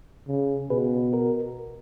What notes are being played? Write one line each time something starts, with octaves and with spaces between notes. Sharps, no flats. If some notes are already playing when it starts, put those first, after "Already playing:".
C#3
B2 G#4 B4
F#4 A#4